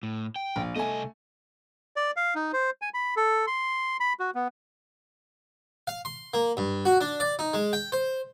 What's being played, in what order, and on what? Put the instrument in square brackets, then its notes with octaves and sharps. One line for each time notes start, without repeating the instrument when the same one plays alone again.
[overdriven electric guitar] A2
G5
[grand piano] A#1
[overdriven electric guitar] C2 D#5 [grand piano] A3 G#5
[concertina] D5
F5
D#4
C5
G#5
B5
A4
C6
B5
F#4
B3
[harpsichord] F5
C6
A#3
G2
F#4
D4
D5
D#4
G#3
G5
C5